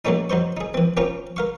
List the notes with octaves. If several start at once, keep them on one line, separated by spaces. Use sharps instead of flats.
F#3 A3 A#3 C#4 D#4
F#3 D#4 C5 C#6
D#4 G#4
E3 C4
C4 C#4 F4 A#4 C#6
A#4 F5 C#6